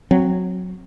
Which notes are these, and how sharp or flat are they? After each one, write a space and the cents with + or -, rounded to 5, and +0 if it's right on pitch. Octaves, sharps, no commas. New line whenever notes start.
F#3 -10 C4 +0